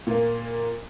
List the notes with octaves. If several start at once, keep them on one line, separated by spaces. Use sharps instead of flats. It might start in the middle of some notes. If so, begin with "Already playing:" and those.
A#2 A#3